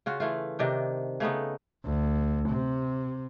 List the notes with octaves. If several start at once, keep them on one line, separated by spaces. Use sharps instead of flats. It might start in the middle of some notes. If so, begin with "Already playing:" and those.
C#3 F4 F#4
E3 A3 F4
C3 D#3 D4
C#3 A3 B3 D#4
D2
C3